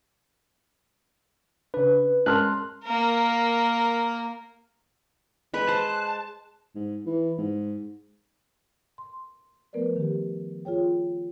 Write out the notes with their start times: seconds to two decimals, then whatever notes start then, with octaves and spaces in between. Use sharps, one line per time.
1.74 C#3 D4 B4
2.26 G#3 C#4 A#4 A5 C6 F6 F#6
2.84 A#3 A#4
5.54 G#3 B4 F#6
5.68 C5 A5
6.75 G#2
7.06 E3
7.38 G#2
8.98 C6
9.73 F3 A3 B3 A#4 B4 D5
9.96 D#3 G4
10.65 F4 G#4 C#5 G5